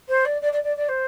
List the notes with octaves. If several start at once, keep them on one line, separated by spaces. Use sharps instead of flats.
C5
D5
D5
D5
D5
D5
C5